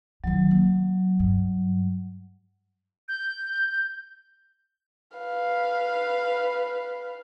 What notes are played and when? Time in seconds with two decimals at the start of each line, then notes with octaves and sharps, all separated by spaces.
0.24 D#3 E3 F#3
0.51 A#3
1.19 G2
3.08 G6
5.17 B4 F5